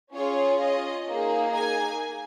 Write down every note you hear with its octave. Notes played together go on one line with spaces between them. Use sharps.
C#4 F4 G#4 C#5
D#5
A#3 D#4 G#4
G#5